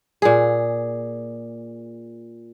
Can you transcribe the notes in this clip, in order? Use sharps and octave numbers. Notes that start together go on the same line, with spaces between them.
A#2 G#4